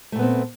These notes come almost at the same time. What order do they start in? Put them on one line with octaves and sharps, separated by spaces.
A3 A#2 B3 C4